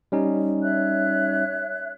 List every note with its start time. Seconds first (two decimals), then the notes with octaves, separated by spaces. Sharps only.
0.12 G3 C#4 D#4
0.63 C#5 E5 F#6